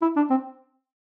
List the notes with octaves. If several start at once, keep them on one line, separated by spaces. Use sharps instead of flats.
E4
D4
C4